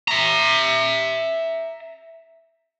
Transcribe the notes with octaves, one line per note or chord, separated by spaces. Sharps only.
E5 A#5